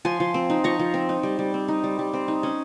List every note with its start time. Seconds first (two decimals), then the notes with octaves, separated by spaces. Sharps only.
0.05 F3 G#5 C6
0.20 F3
0.34 C4
0.50 D#4
0.64 F3 A#5 C#6
0.79 F3
0.94 C4
1.09 D#4
1.23 G3
1.39 G3
1.54 C4
1.68 D#4
1.84 G3
1.99 G3
2.14 C4
2.28 D#4
2.43 C#4